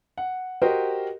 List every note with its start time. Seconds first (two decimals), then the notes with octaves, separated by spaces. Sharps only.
0.18 F#5
0.62 F#4 G4 A#4 C5 D#5